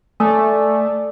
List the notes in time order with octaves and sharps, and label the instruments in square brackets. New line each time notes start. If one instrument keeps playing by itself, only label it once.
[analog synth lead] A3 [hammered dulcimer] D5 [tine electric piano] G#5 D#6 E6